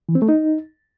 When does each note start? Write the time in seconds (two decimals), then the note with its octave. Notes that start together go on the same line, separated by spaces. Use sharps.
0.09 E3
0.15 C4
0.22 A3
0.29 D#4